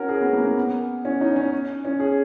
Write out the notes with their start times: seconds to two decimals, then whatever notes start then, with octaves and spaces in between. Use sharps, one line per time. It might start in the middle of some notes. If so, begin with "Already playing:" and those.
Already playing: C#4 F#4 A#4
0.09 G#4
0.22 B3
0.33 A#3
0.44 A#3
0.57 B3
1.05 C#4
1.21 D#4
1.36 C#4
1.85 C#4
2.00 G#4